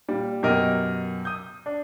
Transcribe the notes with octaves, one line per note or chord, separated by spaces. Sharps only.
A#2 G3
F#2 B2 G4 A#4 D#5
D#6 G6
D4